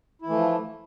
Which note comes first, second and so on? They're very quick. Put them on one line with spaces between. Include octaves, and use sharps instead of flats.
E4 E3 A3 F3